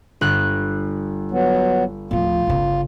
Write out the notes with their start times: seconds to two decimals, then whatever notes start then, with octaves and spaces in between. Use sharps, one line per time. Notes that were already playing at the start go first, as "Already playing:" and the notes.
0.21 G1 F#6
1.31 F#3 B3
2.11 D1 F3 F4
2.47 G1 C#3